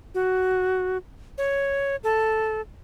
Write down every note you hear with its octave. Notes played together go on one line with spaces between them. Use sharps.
F#4
C#5
A4